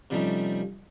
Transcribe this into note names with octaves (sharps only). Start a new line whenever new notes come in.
C3 F3 G3 A3 C#4 D#4